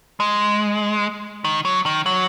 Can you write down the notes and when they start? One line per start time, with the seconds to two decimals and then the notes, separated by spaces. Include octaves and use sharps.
0.20 G#3
1.44 D#3
1.65 F#3
1.86 D#3
2.06 F#3